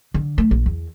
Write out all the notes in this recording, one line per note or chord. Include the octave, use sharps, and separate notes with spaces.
D3
A3
A#1
E2